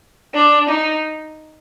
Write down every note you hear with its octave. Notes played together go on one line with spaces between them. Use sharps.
D4
D#4